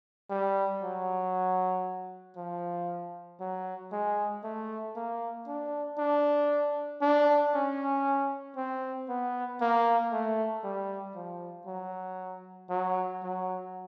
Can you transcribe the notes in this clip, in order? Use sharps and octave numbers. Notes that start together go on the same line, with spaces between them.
G3
F#3
F3
F#3
G#3
A3
A#3
D4
D4
D4
C#4
C4
B3
A#3
A3
G3
F3
F#3
F#3
F#3